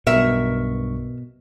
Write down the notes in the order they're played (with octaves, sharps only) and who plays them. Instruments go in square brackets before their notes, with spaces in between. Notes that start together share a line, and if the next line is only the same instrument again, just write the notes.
[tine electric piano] B1 G2 C#6 [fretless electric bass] B2 [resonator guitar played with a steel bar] A#4 E5